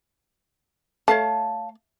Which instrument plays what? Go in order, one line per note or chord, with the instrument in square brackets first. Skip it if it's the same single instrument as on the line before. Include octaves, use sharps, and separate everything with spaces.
[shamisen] A3 [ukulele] C#5 F5 A5